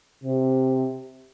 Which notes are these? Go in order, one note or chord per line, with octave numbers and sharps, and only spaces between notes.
C3